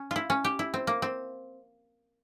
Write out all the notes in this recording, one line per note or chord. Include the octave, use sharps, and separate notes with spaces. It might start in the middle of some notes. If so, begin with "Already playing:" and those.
Already playing: C#4
E4 F4
C#4
G4
E4
C4
A#3
C4